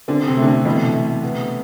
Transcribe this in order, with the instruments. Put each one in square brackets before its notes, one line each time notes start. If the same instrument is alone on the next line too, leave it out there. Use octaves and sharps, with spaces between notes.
[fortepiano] D3 [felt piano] C4
[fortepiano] C3
[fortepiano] D3 [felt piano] A3
[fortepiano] C3
[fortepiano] B2 [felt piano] E3
[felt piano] A3
B3